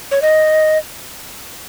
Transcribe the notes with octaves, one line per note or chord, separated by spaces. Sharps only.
C#5
D#5